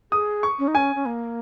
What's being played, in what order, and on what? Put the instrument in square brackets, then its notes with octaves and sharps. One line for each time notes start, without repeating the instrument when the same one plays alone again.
[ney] G#4 [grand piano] D#6
[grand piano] C#6
[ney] C#4
D#4
[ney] C#4 [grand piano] G#5
[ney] C#4
A#3